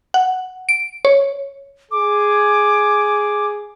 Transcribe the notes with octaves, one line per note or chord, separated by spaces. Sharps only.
F#5
D7
C#5
G#4 D6